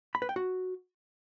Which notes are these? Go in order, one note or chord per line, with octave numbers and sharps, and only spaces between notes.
B5
B4
G5
F#4